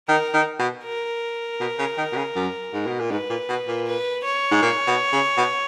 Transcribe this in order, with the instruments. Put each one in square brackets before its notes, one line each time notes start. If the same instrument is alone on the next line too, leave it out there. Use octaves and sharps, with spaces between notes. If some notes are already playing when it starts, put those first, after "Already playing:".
[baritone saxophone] D#3 [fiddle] A#4
[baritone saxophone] D#3
B2
[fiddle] A#4
[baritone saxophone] B2
C#3
D#3
B2
C#3
F#2
G#2
B2
A#2
[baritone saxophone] G#2 [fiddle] B4
[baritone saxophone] A#2
B2
A#2
[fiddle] B4
C#5
[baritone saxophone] G#2
A#2
B2
C#3
B2